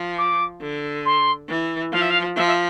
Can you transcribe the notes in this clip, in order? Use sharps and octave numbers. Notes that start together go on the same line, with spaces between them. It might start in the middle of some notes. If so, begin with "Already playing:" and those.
Already playing: F3
D6
D3
C6
E3
F3 F5
E5
F5
F3 E5
E5